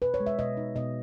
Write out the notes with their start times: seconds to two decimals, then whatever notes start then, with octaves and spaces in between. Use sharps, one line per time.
0.02 B2 B4
0.14 C#5
0.20 G#3
0.26 E5
0.39 B2 D#5
0.57 D#4
0.75 B2 D#5